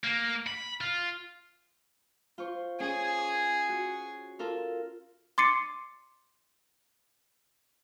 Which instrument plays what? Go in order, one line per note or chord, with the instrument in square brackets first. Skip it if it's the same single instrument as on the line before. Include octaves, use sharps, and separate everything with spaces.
[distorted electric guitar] A#3
B5
F4
[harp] F4 C5 C#6
[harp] C#4 [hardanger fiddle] G#4
[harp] D#6
F#4
F4 A4 A#4
[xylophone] C6 D6 A6 C7 C#7 D#7